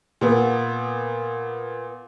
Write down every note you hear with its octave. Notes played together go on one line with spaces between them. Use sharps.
A#2 B3